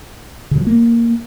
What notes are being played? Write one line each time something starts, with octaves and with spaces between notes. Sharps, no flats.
C#3
F#3
F3
A#3